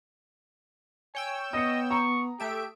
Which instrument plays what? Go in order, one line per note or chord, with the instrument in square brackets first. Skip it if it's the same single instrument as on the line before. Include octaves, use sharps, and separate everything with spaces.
[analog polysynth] C#5 G5 E6 [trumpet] G#5
[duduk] B3 [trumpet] D#5 [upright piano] D#6 C#7
[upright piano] A#5 [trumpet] C#6
[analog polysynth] A3 E5 D7 [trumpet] G4